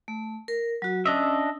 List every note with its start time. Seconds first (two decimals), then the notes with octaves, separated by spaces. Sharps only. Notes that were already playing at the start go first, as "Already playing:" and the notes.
0.08 A3
0.48 A#4
0.82 F#3 F#4
1.06 C#4 D4 D#5 E5